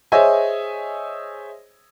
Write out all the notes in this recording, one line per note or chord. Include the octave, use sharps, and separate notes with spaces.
G#4 C5 C#5 D#5 E5 G#5